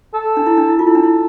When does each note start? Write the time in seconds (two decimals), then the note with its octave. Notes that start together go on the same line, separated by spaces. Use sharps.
0.14 A4
0.37 D4
0.47 E4
0.57 D4
0.69 E4
0.79 F4 A4
0.87 E4
0.95 D4
1.03 E4